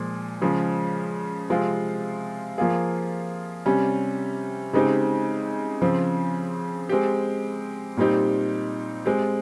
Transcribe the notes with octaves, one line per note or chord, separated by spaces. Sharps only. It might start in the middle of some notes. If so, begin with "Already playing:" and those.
Already playing: A#2 F3 G#3
C#3 F3 G#3
C3 F3 G#3 C4 F4
F3 A#3 F4 G#4
C3 G3 C#4
C#3 G#3 C4 D#4 G4
C#3 F3 C4
G#3 C4 G4
A#2 G3 C4 D#4 G4
G#3 C4 G4